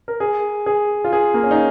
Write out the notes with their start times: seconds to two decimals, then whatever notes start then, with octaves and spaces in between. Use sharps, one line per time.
0.08 A#4
0.20 G#4
0.66 G#4
1.04 F4
1.13 G#4
1.34 A#3
1.43 C#4
1.51 D#4